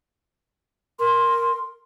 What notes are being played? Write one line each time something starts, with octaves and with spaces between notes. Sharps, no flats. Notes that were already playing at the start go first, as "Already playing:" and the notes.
A#4 C6